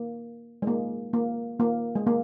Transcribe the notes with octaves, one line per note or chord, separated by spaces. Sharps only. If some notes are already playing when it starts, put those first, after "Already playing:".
Already playing: A#3
G#3
A#3
A#3
A#3
G#3
A#3